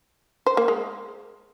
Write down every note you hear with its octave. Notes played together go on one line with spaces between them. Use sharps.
C5
A#3
G#3